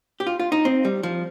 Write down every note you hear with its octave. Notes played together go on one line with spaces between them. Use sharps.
G4
F4
F4
D#4
C4
G3
F3